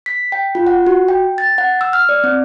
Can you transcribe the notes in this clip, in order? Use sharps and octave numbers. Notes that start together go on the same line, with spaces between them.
B6
G5
F4
F#5
F#4
G5
A6
F#5
E6
F6
D5
C4